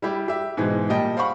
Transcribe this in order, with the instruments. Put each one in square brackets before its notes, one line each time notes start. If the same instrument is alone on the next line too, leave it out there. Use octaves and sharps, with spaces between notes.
[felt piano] G3 E4 G4
G4 E5
G#2 B2 E3 G#3
A#2 G3 D#5 G5 A5
C5 F5 F#5 B5 C#6